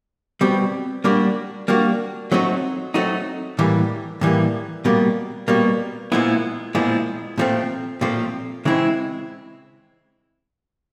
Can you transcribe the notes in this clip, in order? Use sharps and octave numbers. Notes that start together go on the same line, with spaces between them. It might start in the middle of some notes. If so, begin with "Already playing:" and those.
B2 G3 C4
G3 A#3 D4 F#4
G3 A#3 D4 F#4
F#3 A3 C4 D#4 F#4
F#3 A3 C4 D#4 F#4
A2 E3 G3 A#3
A2 E3 G3 A#3
B2 G3 A#3
B2 G3 A#3
A#2 F3 G#3 B3 E4
A#2 F3 G#3 B3 E4
A#2 F3 A3 C4
A#2 F3 A3 C4
C#3 E3 G#3 C4 E4